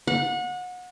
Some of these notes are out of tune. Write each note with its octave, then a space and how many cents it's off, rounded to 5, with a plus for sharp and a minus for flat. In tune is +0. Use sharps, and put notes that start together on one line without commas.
F#5 -30